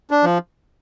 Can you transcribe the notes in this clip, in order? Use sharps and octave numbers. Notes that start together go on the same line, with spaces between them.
D4
F3